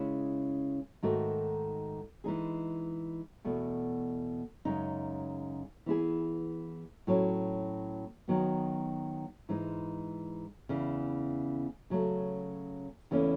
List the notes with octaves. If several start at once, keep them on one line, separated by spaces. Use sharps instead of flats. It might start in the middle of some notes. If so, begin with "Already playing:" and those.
Already playing: C#3 G#3 C#4 E4
G#2 D#3 A3 D#4 F#4
E3 G#3 D#4 G#4
E2 B2 A3
F#2 C#3 G#3 D#4
E3 B3 E4 G#4
A2 F#3 C#4
D#3 F#3 B3
G#2 E3 G#3 D#4
E2 C#3 E3
C#3 F#3 A3
E2 C#3 E3 A3 C#4